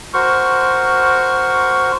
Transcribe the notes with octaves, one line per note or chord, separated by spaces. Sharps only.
F#4 A#4 C5 C#6